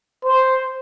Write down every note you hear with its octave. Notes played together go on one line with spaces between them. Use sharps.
C5